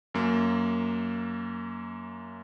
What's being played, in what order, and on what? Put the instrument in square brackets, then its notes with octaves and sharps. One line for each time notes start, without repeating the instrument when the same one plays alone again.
[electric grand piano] F#2 A#3